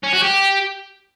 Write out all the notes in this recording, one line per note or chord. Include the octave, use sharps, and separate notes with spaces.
C#4
F#4
G4